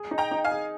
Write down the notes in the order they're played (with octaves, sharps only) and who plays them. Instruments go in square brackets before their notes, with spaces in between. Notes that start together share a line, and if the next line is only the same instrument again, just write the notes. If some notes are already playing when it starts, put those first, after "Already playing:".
Already playing: [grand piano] G#4
D#4
[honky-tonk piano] G5 A#5
[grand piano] D#4
[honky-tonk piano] F5 G#5
[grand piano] G#4